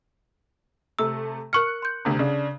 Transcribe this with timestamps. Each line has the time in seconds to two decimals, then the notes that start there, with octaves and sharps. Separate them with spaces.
0.99 C3 A3 E6
1.53 A#4 C#6 F6 F#6 C#7
1.82 C6 G6
2.05 D2 C3
2.19 C#3 D4